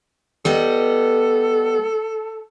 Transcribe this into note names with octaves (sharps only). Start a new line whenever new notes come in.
G3 B3 A4 D#5